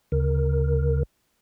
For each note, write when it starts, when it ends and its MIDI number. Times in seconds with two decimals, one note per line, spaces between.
0.12 1.03 38
0.12 1.03 49
0.12 1.03 70